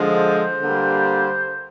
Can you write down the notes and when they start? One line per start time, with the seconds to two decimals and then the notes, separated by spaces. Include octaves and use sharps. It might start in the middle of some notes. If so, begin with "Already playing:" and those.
Already playing: D3 F3 G#3
0.18 C5
0.61 D3 G3 A#3